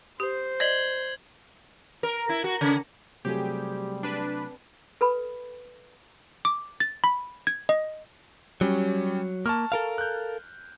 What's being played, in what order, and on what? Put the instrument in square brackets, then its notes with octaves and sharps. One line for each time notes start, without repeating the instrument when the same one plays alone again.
[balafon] G4 [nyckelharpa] C5
[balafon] D5 D#5 [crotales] G#6 F#7 G7
[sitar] A#4
E4
F#4
C#3
[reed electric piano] C3 F#3 A3 [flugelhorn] G3 [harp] C4 G#4 [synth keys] G4
[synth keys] D4 B4
[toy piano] A4 B4 B5
[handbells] D6
A6
B5
G#6
D#5
[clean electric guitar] F#3 [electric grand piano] G3 C#4
[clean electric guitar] A#3 [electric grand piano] A5 C#6 F6
[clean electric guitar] A4 A#4 F5
[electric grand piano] F#6 G6